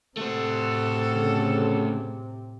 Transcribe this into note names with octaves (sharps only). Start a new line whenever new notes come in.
A2 C3 A3 F#4 A4 C5
C#3